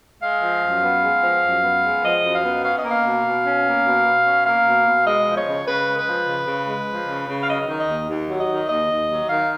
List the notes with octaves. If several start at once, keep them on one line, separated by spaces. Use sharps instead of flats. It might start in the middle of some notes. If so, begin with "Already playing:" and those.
G#3 F5
F3
F#2
B3
G#3
F3
F#2
B3
G#3
F3 D#5
F#2
F5
B3
C#4 F5
D#5
A#3
F5
B2
B2
C#4
A#3
B2
B2
C#4
A#3 F5
B2
B2
G#3 D#5
F3
C#5
C#3
C#3 B4
G#3
B4
F3
C#3
C#3
G#3
F3
C#3
C#3
F5
F#3 D#5
D#3
D#5
D#2
D#2
F#3
D#5
D#3
D#2 D#5
D#2
F#3
D#3 F5